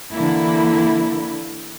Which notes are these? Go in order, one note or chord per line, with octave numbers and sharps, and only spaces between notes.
D3 E3 A#3 E4